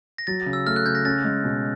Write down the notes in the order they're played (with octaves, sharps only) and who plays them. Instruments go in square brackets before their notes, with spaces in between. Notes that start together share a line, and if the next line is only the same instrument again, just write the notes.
[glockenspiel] A#6
[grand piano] F#3 [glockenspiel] A6
[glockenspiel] A6
[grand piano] C#3
[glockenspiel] E6
[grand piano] A3 [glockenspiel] F6
[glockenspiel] F#6
[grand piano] C#3 [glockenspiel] G6
[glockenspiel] A#6
[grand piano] C#4 [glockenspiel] A6
[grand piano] G#3
B2